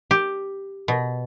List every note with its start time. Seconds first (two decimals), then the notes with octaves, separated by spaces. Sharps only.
0.11 G4
0.88 B2